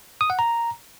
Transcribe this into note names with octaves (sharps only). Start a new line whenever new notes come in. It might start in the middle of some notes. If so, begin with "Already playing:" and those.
D#6
F#5
A#5